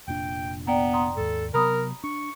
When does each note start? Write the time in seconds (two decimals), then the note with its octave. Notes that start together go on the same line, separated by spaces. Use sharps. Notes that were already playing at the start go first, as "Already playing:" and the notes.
0.08 F1 A#2 D4 G5
0.67 B3 D5 G5 A#5
0.93 A#5 C6 D#6
1.17 D#2 G#2 A4
1.54 C3 F#3 B3 A#4 A#5 B5 D#6
2.04 D4 C#6